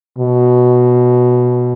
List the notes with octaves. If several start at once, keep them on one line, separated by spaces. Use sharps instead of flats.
B2